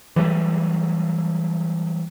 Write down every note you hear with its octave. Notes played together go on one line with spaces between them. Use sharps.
E3 F#3 G3 A3